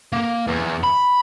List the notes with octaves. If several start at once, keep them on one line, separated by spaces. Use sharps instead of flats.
A#3
E2
B5